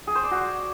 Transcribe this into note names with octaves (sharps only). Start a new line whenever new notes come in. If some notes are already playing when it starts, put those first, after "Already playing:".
G#4
C5
D5
F#4